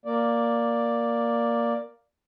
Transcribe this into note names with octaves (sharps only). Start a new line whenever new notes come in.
A#3 D5